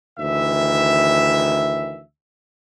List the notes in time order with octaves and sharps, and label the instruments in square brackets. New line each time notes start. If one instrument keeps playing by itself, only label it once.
[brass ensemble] D2 D#3 E3 E5